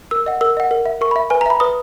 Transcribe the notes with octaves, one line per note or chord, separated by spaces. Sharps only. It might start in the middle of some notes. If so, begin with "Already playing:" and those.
A#4 E6
D#5 F#5
A#4 E6
D#5 F#5
A#4
E5
A#4 C#6
B5
E5
B4 G#5
A#5
E5 B5
B4 D#6